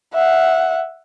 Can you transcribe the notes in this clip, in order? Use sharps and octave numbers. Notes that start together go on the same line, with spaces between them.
E5 F#5